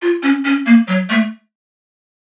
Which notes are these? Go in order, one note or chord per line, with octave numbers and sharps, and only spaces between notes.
F4
C#4
C#4
A#3
F#3
A3